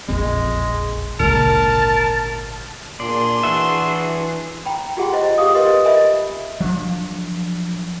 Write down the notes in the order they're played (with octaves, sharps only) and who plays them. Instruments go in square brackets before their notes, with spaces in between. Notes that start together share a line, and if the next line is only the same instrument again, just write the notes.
[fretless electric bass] E1 A#1 F2 [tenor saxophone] G#3 [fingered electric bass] C4
[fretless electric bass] G#1 A#2 D3 [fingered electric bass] C#2 G#3 [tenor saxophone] A#4 [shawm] A5
[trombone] A#2 [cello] D4 G#4 [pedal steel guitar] D5 [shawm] C6
[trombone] E3 [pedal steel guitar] F#4 E5
[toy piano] G5 A#5 B5
F4 G4 G#4 F#5 G5 C6
E4 F4 C5 D#5
G4 G#4 F5 D#6
G4 A#4 B4 D#5 F5 C6
A#4 D#5 E5 G#5 B5
[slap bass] F3 F#3 D4